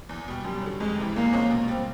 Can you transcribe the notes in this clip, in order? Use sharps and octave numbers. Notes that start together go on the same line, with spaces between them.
E2
B2 G3
F#2 G3
D3 F#3
F2 G#3
C3 E3 G3
E2 A#3
C3 F3 G#3 C#4
B2
G3 C4